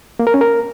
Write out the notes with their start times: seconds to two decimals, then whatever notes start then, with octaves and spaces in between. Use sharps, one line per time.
0.19 A#3
0.27 A#4
0.34 C#4
0.41 A#4